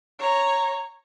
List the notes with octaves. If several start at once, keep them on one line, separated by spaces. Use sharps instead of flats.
C#5 A#5